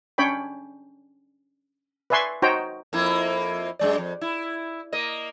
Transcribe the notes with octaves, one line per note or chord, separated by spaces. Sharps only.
C#4 D4 C#5 G5 B5
B4 D5 E5 G#5 C6 C#6
D#4 F#4 C5 C#5 G5 A#5
F2 A#3 E4
F#2 G#3 D5
F2
E4
A#3 D#5